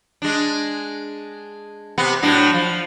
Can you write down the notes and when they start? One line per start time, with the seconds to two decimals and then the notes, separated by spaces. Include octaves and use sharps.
0.22 G#3 D4
1.98 C3 B3
2.23 A2 F#3 D4
2.53 F3